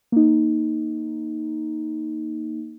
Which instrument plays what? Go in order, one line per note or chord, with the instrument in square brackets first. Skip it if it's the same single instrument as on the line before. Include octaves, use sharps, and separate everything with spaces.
[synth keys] A#3 D#4